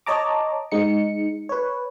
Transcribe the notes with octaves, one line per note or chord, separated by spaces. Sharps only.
C#5 D#5 A5 A#5 D6
G#3 D#4 C#7
B4 C#5